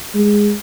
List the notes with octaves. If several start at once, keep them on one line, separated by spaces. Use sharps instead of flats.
G#3